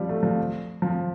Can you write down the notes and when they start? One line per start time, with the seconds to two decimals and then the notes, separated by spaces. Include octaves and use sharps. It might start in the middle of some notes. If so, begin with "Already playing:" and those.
Already playing: F3 G3
0.09 A3
0.23 F3
0.82 F3